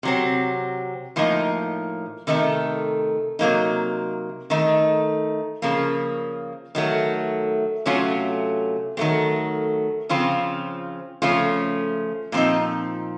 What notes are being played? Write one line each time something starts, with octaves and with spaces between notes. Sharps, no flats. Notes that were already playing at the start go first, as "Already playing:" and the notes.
C3 F#3 C4
A2 F3 A#3 D#4
C3 D#3 A3 D#4
C3 F#3 A#3 D#4
D#3 A3 D#4
C#3 F3 A#3
D#3 F#3 A3
C3 F#3 A3 C#4 F4
D#3 F#3 A3 C4
C#3 F3 C4 F4
C#3 F3 A3 C#4 F4
A#2 F3 C4 D#4